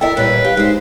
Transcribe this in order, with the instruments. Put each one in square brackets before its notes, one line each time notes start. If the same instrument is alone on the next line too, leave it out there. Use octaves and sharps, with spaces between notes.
[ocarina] E4 [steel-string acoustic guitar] A4 A#4 [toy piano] D#5 G5 [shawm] E5
[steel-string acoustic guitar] A#2 G3 [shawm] B4 [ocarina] C#5
[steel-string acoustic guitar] G4 [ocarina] F5
[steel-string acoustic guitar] G#3 C5 [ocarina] D#4